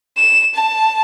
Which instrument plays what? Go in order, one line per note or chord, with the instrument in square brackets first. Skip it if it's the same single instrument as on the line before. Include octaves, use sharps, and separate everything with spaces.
[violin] E7
A5